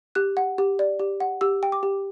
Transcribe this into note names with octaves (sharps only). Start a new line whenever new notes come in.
G4 F#6
F#5
G4
D5
G4
F#5
G4 E6
G5
D6
G4